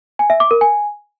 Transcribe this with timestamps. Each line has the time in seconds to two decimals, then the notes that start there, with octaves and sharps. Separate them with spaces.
0.19 G#5
0.30 E5
0.40 D6
0.51 A#4
0.61 G#5